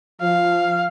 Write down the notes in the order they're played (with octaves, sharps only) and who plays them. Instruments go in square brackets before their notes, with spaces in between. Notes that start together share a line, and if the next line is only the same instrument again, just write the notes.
[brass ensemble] F3 [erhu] F5